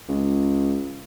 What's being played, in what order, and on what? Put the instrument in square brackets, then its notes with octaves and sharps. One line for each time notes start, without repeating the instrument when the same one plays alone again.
[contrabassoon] C#2